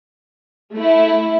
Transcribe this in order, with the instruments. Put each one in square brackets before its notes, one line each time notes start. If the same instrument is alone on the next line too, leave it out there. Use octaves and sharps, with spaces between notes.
[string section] A3 E4